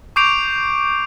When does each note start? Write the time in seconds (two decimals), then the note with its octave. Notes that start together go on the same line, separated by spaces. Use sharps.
0.16 C#6 D6 G6 C7 D7 F7